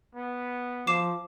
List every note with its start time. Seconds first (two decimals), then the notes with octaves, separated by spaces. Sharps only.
0.15 B3
0.87 F3 D6 C7 E7